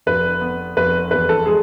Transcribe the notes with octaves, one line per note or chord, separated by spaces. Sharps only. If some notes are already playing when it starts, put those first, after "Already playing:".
F1 B4
B3
F1 B4
E2 B4
A4
G#3 G#4